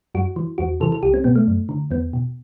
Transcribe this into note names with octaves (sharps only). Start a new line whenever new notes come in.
F#2 F#4
E3
E2 F#4
C3 E3 A4
A4
C2 G4
C4
B2 B3
A3
F#2
D3
E2 B3
B2